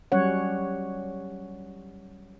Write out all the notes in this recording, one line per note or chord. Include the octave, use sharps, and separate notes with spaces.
F#3 G3 C#4 C#5 F#5